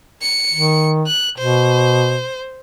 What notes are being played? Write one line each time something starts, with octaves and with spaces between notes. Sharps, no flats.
C#7
D#3
F#6
B2 C5